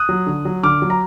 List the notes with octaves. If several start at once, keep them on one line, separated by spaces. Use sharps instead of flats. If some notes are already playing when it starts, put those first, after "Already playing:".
Already playing: D#6 F#6
F#3
D3
F#3
D3 D6 F6
F#3
A#5